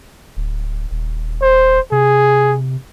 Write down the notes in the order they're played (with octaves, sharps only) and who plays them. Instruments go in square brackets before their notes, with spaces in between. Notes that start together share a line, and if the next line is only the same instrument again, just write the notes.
[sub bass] D1
D#1
[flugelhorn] C5
[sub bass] C3 [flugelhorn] G#4